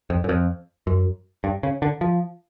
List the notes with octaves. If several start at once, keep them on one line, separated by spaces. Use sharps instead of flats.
F2
F#2
F2
F#2
G2
C#3
D3
F3